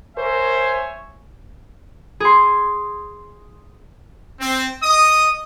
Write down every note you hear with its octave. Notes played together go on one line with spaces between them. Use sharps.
A#4 C5 C#5 E5 G#5
G#4 C6
C4
D#5 D#6